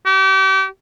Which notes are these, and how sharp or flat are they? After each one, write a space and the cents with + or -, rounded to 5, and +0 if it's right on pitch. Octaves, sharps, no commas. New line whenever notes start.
G4 -35